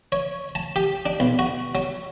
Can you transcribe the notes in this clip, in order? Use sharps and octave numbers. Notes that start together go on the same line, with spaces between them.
C#5
A5
G4
D4
B1
F#4
F#3